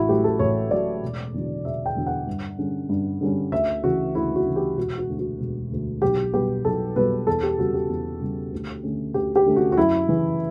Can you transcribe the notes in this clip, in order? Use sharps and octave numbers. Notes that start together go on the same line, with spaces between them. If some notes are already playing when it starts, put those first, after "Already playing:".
Already playing: A1 E4 F#4
A2 F#3 G4
A4
A1 C#5
A2 F#3 D5
E1
E2 D3 F#3
E1 E5
G5
E2 D3 F#3
F#5
G2
D3 G3 C#4
G2
D3 G3 C#4
D2 E5
C#3 E3 F#4
D2 E4
F#4
C#3 E3
G4
E1 F#4
F#4
D2 D3
F#4
E1
D2 D3
B1 G4
B2 G3 B3 G4
B1 A4
B2 G3 B3 B4
E2 A4
G4
C#3 G3 F#4
G4
E2
C#3 G3
D2
D3 A3 C#4
D2 G4
G4
D3 A3 C#4
F#4
F#4
F#2 E4
C#3 E3